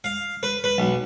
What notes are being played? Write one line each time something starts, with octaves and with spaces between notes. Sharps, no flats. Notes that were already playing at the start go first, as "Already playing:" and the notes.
F5
B4
B4
B1